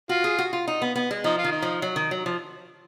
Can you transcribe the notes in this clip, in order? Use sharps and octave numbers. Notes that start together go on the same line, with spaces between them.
F4 F#4
G#4
F#4
F4
D#4
B3
B3
G#3
F3 D#4
F4
D#3
D#4
F3
F#3
D#3
F#3
F3